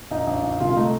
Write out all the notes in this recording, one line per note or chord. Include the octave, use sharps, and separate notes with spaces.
A#1 D#4
A#1
A#1
C2 F4
A3 D#4